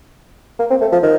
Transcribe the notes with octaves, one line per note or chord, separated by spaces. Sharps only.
A#3
C4
A3
F3
D#3